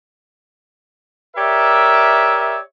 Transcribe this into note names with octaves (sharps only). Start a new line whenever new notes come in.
G4 A#4 C#5 D5 E5